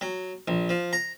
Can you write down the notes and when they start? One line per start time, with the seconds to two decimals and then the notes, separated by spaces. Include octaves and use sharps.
0.01 F#3
0.48 A#1
0.69 F3
0.93 A#5